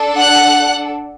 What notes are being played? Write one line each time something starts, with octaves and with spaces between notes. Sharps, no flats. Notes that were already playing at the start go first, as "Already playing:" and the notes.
Already playing: D4 A4
F#5 F#6